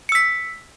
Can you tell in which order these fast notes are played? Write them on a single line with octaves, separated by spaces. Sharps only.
C#7 E6 B6